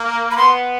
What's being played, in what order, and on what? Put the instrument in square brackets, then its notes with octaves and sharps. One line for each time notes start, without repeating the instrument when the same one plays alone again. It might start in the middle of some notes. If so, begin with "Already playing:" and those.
Already playing: [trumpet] A#3
[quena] B5
[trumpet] B3 [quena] C6